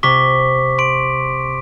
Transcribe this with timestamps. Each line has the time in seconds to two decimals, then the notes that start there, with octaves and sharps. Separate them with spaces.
0.03 C3 C#6 D6 B6
0.78 C6 D7